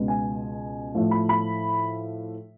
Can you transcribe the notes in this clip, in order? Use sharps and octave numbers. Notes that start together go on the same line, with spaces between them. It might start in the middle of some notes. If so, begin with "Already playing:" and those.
Already playing: C#2 B2 G#3
G#5
A2 F3 A3
B5
B5